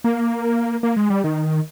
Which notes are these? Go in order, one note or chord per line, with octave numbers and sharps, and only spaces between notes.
A#3
A#3
G#3
G3
D#3